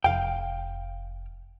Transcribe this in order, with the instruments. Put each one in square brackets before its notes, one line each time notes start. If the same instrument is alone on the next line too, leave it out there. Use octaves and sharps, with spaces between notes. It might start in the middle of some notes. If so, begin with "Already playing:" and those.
[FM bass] F1 [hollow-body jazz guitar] F5 G5